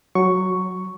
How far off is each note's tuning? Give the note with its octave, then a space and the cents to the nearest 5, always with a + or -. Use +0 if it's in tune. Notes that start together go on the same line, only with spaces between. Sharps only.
F#3 +0 C#6 +0